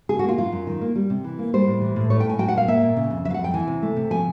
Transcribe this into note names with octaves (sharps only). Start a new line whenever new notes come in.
C#3 G#4
F#4
A#3 F4
F#3 F4
F#2
D#3
A#3
G3
C3
E3
A#3
G3 C5
A2
E3
A2
A3 C#5
G5
A2 G#5
F#3 G5
F#5
A#2 F5
A#3 E5
A#2
C#3
F2
F#3 E5
F5
F#5
F2
G5
E3 G#5
C3
A3
C3
F3 G#5